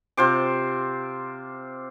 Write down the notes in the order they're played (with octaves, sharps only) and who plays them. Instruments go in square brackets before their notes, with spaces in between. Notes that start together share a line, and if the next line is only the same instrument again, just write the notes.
[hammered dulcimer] C3 F4 C5 D6